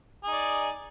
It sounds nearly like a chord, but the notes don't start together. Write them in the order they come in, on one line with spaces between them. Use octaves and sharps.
G#4 D#4 D5